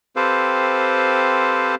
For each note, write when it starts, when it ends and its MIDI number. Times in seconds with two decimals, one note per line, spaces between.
0.16 1.75 60
0.16 1.75 67
0.16 1.75 69
0.16 1.75 71
0.16 1.75 72
0.16 1.75 77